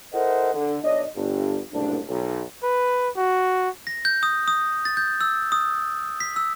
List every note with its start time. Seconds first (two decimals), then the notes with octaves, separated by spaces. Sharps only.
0.13 E4 A4 A#4 C5 D#5 F#5
0.54 D3
0.83 B1 D4 C#5 D#5
1.15 G1 G2
1.72 F#1 C2 A2 D4
2.08 B1
2.63 B4
3.17 F#4
3.87 A#6
4.05 G6
4.23 D#6
4.48 D#6
4.85 A6
4.97 G6
5.21 E6
5.52 D#6
6.20 B6
6.36 E6